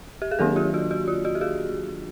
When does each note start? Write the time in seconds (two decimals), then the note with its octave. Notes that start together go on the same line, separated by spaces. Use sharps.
0.22 G4
0.31 G#4
0.39 D#3 F#3 A#3 D4 G4 A4
0.56 F4 G4
0.74 F#4
0.91 F#4
1.08 F4
1.25 F#4
1.35 G4
1.41 F#4 G#4